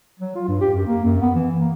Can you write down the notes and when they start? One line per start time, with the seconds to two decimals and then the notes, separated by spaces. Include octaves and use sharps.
0.20 F#3
0.35 F4
0.48 G2
0.61 G4
0.74 F#2
0.87 A#3
1.04 F#2
1.21 B3
1.35 E3
1.59 A#3